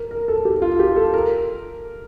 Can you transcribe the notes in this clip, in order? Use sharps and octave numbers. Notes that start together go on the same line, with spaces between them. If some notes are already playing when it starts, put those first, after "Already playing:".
Already playing: A#4
A#4
A4
G4
F4
G4
A4
A#4